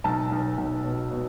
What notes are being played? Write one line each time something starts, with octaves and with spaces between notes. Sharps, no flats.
B1 A5
B1
B1
B2
B2